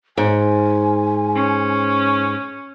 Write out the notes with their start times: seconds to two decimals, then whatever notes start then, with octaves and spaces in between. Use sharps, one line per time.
0.18 G#2 G#5
1.35 C#4